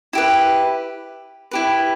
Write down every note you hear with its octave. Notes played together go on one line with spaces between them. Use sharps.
E4 G4 B4
E4 G4 B4